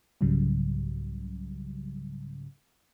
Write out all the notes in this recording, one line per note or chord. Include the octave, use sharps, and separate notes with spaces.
C2 G#2 C#3 F#3 G3